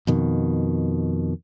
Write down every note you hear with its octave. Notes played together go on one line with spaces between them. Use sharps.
F2 B2 D#3